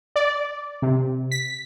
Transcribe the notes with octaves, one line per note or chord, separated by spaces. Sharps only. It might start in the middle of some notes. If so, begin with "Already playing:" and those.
D5
C3
B6